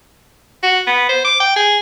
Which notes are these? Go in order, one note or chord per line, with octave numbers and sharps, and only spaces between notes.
F#4
B3
C5
D6
G5
G#4